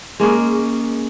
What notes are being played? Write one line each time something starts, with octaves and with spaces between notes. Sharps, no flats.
G#3 A#3 C#4 G#4